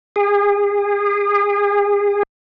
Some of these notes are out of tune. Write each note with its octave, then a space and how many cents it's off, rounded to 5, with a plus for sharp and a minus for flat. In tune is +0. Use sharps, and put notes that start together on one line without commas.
G#4 -35